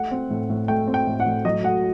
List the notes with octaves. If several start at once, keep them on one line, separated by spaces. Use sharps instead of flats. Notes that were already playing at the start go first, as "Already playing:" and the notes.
Already playing: A3 F#5
C4
A2
A2
A3 G5
C4
G5
A2
F#5
A2
F#3 D#5
A3 F#5